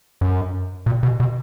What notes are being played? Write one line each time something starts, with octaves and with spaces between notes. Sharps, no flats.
F#2
A#2
B2
B2